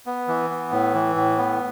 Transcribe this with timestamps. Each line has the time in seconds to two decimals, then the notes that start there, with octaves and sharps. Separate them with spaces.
0.06 B3
0.28 E3
0.50 B3
0.72 A2
0.94 E3
1.16 A2
1.38 B3